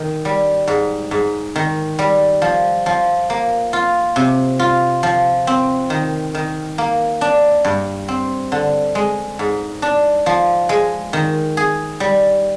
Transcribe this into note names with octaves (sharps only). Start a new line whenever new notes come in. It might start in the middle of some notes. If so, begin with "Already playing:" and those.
Already playing: D#3
G3
G#2
G#2
D#3
G3
F3
F3
A#3
F4
C3
F4
F3
C4
D#3
D#3
A#3
D4
G2
C4
D3
G#3
G#2
D4
F3
G#3
D#3
G#4
G3